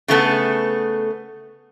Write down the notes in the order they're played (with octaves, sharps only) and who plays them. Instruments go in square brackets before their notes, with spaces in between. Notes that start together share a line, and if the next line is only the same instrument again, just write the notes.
[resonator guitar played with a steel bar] C#3 A3 B3 A4